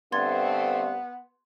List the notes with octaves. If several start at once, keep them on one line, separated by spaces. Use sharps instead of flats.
G2 D3 A3 B3 C4 C6 G#6 A6